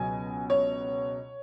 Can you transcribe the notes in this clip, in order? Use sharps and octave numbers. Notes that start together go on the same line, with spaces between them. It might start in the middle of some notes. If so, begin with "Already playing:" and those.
Already playing: C#2 B2 F#3 G#5
C#5